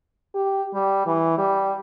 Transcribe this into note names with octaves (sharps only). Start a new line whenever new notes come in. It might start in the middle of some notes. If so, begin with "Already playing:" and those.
G4
G3
E3
G3